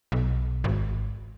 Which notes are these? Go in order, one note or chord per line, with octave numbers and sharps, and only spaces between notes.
B1
G#1